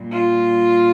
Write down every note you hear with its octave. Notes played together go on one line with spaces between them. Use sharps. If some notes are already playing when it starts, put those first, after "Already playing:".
Already playing: A#2 G3
F4